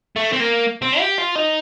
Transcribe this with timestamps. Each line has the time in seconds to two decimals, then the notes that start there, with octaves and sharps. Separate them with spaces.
0.16 A3
0.32 C4
0.40 A#3
0.82 C4
1.00 G4
1.18 F4
1.36 D#4